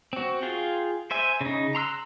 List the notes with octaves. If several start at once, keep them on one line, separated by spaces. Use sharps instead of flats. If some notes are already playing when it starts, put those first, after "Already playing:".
C4 F#4
F4 G#4 G5
C5 E5 G#5
C#3 D#4
A#5 C6 E6 F#6